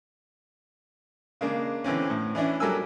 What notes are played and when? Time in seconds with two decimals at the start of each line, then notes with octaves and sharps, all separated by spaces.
1.41 C#3 G#3 A#3 D4
1.84 D3 E3 C4 C#4
2.10 A2
2.35 E3 C#4 D4 E4
2.60 F#3 G3 A4 A#4 G#5 E6